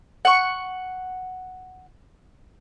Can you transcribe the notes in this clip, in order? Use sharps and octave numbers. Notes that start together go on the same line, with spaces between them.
F#5 C#6